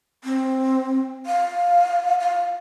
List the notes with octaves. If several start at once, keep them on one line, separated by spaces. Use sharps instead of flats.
C4
F5
F5